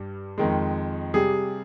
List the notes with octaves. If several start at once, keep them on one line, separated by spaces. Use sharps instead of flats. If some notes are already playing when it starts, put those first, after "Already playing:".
Already playing: G2 G3
F2 D#3 G#3
C3 G3 G#4